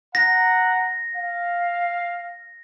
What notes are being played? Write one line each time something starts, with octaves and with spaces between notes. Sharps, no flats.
F#5 A#5 A#6
F5